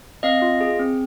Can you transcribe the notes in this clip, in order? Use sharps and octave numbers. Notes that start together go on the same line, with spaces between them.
C4 D#5 F5
F4
G#4
C4